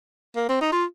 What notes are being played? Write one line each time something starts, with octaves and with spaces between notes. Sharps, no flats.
A#3
C4
D#4
F4